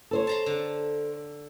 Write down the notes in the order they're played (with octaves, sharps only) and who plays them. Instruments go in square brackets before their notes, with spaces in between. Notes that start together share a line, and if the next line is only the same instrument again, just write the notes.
[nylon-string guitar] A4 C5 C#5
[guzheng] A5 A#5 C6
D3